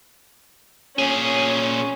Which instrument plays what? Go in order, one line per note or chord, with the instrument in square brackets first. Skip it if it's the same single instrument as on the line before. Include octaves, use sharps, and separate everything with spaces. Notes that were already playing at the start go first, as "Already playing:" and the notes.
[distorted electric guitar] A#2 G#4 [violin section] C#4